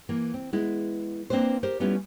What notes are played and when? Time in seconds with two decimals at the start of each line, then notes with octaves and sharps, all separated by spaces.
0.09 E3 A#3
0.34 C4
0.53 G#3 B3 E4
1.30 A#3 C4 D4 B4 C5
1.63 G4 A#4 C5
1.80 G3 A3 B3 C#4 E4 F4